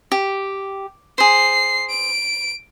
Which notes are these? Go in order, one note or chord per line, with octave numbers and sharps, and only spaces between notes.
G4
G#4 C5 C7
D7